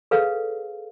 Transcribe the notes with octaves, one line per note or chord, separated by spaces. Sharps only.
G#4 A4 B4 C#5 F5